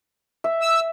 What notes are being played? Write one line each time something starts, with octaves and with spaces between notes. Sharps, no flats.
E5
E6